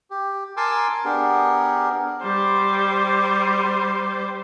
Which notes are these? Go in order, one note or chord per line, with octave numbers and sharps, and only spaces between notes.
G4
A#4 G#5 A5 C6 D6 E6
B3 D4 G4 G#4 A#4
G3 C5